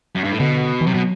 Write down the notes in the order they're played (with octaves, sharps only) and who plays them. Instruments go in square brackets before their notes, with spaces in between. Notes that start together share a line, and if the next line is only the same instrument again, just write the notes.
[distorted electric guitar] F#2
G2
A2
[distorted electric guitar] B2 [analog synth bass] D3
[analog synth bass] E3
[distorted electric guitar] C3 [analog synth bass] F#3
[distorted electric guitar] B2